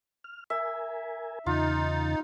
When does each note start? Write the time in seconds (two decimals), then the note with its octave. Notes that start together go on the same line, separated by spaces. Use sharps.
0.24 F6
0.50 A#4 E5 G#5
1.46 E2 C#3 D#4 F4 A6